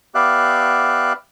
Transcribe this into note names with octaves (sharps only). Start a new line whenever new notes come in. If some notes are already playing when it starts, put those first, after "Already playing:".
B3 G4 D5 E5 F5 F#6